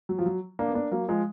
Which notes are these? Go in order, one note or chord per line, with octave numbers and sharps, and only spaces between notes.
F#3
F3
F#3
A#3 D4
B3
A#3 D4
F#3 A#3
F3 G#3